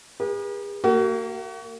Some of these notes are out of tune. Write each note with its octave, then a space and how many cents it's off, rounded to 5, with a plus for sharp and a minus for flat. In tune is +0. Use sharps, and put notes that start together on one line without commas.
G#4 -45 B4 -45
A#3 -30 F#4 +35